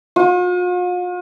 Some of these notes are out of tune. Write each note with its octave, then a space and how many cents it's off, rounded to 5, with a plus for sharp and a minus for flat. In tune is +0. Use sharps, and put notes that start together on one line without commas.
F4 +45